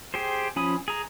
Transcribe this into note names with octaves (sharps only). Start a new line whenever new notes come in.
G4 G#4 C5
F3 C#4 G#5 B5 D#6
G#4 A#5